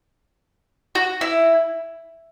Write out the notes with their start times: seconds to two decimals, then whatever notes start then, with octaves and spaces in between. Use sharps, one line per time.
0.95 F#4
1.21 E4